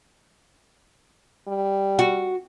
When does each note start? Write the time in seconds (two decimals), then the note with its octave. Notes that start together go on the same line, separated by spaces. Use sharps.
1.48 G3
1.99 F#4